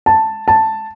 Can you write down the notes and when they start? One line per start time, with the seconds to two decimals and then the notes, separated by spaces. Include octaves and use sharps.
0.06 A5
0.48 A5